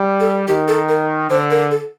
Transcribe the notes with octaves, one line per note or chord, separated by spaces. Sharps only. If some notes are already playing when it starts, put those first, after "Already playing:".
Already playing: G3
A4
D#3 G4
A4
A#4
D3 C5
A#4
A4